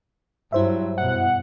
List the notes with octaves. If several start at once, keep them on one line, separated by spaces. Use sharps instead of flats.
G2 F#3 E4 C5 E5
F#2 B2 F#5